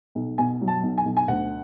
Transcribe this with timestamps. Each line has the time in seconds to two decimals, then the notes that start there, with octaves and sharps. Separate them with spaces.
0.15 B1
0.38 B2 G#5
0.61 F#3
0.68 A5
0.83 B1
0.98 G#5
1.05 B1
1.17 G#5
1.28 D2 F#5